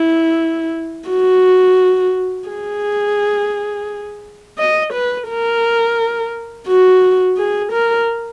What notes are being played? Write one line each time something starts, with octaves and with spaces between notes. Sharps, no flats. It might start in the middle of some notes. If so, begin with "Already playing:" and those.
Already playing: E4
F#4
G#4
D#5
B4
A#4
F#4
G#4
A#4